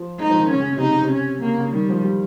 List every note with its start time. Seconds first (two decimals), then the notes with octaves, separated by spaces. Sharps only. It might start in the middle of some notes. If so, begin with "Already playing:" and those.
Already playing: F3
0.19 G#3 D#4
0.29 F3
0.40 D#3
0.50 C#3 C#4
0.60 C#3
0.70 C#3
0.76 C3
0.80 C#3 D#4
0.91 C#3
1.02 C3
1.11 C#4
1.42 C#3 A#3
1.58 C#3
1.73 D#3 G3
1.89 F3
2.04 G3